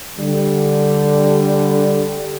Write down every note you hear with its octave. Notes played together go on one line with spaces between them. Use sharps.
D3 G3